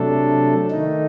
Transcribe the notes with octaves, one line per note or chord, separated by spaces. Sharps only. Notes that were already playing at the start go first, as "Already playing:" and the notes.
Already playing: C3 F#3 A3 D4 A4
D#3 A3 D#4